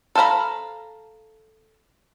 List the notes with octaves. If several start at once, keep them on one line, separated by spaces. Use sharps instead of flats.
A4 C5 F5 A#5 B5